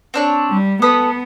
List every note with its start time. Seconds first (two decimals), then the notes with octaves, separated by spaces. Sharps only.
0.14 C4 D4 C#5
0.50 G3
0.82 B3 A4 B4 D#6